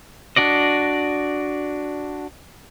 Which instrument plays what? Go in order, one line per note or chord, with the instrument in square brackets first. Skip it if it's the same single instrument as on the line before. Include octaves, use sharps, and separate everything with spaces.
[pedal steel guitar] D4 F#4 D5 D#5